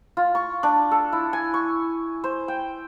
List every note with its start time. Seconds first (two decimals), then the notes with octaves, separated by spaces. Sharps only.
0.17 F4
0.35 C#6
0.63 D4
0.91 A4
1.13 E4
1.33 G#5
1.54 C#6
2.24 C5
2.48 G5